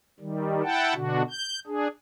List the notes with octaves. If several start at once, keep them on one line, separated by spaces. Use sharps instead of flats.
D#3 G3
E4 F#5 G5 A5
B2 D3 D4 F#4
G6
D4 G#4